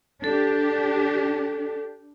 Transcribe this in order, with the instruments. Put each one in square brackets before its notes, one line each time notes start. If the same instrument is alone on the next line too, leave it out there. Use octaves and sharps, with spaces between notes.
[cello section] D4 G4 [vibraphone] A4